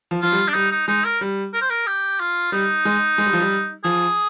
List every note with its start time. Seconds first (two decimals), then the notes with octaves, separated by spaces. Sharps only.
0.11 F3
0.21 F3 F4
0.32 G3
0.48 D4
0.54 G3 D#4
0.71 D#4
0.87 G#3 D#4
1.04 A#4
1.21 G3
1.54 A#4
1.61 C5
1.70 A#4
1.87 G4
2.20 F4
2.52 G3 D#4
2.85 G#3
3.18 G#3
3.26 G3
3.33 F3
3.40 G3
3.84 F3 G#4